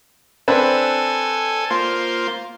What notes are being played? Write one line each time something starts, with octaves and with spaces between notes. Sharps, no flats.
C4 D4 A4 B4 G#5
A#3 F4 C5